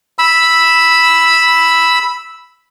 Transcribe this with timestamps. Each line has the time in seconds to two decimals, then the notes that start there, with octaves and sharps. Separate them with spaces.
0.19 B5 E6